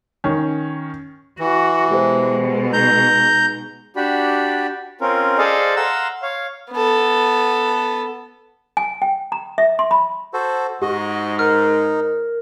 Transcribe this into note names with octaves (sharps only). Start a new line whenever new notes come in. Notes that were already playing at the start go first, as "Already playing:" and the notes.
D#3 C#4
E3 F#4
B2 G#3 G4 A4 C5
D#4 A#5 G6
D4 F#4 G4 D5 B5
C4 C#4 F4 A#4
G#4 A4 C5 D5 D#5 F5
F5 F#5 A#5 C6 E6
C#5 F5
B3 A4
G#5
G5
A#5
E5
C6
B5
F#4 A4 C5
G#2 F#4 G4 D#5
D#4 A#4 F6